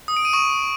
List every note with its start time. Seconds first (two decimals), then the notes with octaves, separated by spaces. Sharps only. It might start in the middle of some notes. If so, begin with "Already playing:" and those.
0.08 D#6
0.17 D7
0.25 D#7
0.33 C#6